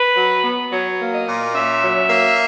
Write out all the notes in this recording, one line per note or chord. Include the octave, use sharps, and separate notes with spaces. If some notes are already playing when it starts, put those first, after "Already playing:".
Already playing: B4
F#3
B3
F#3 C#5
A#3
D#5
A#2
C#4 E5
F#3
A#3